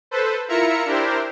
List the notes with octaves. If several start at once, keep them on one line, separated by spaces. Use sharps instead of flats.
A4 B4 C5
E4 F4 A#4 E5 A#5 C#7
D4 E4 G4 A#4 C5